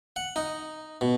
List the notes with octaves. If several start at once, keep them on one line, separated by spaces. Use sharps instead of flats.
F#5
D#4
B2